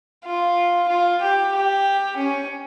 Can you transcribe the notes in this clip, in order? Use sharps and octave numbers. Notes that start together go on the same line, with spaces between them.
F4
F4
G4
G4
C#4